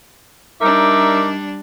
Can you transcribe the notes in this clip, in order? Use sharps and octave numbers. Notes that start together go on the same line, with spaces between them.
G3 D4 D#4 A#4 E5 D6